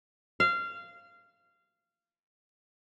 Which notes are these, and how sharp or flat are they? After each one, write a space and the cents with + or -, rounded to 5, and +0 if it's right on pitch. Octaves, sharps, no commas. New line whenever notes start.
F5 -20